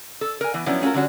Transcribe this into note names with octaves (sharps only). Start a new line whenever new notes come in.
A4
A#4 G#5
E3 B3
F3 F#3 B3 C#4 D4 E4
A3 C#4 F4 F#4 A#4
D3 G3 C#4 F#4